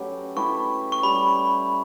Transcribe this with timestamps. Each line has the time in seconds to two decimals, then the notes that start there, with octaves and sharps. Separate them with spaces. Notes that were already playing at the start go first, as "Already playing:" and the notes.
Already playing: F#3 A3 C#4 G4 B4
0.36 A3 E4 G4 B4 C#6
0.92 C#6
1.03 G3 C#4 G4 B5